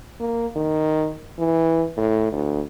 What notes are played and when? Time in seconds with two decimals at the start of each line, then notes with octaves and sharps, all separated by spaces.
0.20 A#3
0.56 D#3
1.39 E3
1.97 A2
2.32 D2